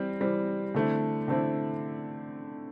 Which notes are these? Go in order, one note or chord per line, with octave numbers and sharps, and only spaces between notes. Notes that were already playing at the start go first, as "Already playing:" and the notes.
Already playing: E3 G3 C4
E3 G3 C4
D3 A3 C4 E4
D3 A3 C4 E4